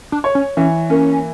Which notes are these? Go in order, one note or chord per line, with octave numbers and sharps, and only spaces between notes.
D4
C#5
C#4
E3 C#4
A#3 C#4